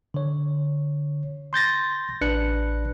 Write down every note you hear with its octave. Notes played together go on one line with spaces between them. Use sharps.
D3 C#5
C6 G6 A6 A#6
A1 D4 B4 F#6 C#7